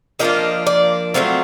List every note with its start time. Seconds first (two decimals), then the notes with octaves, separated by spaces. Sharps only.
0.19 F3 A#3 D4 F4 D#5
0.67 D5
1.14 F#3 A3 C4 F4